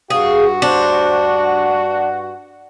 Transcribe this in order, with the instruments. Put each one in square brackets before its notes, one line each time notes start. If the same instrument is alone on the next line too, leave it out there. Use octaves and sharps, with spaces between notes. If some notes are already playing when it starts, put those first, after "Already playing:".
[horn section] G2 F#4 [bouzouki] G#4 [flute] F5
[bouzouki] D4 [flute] C5
[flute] F#5